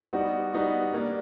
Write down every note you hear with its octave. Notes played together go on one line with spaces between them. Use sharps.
G3 B3 D#4 F#4
G3 B3 D#4 F#4
G3 A#3 D4